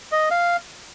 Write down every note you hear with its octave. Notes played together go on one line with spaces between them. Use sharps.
D#5
F5